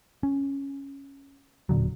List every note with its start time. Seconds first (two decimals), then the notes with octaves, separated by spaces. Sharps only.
0.23 C#4
1.69 E1 A#2 D3 F#3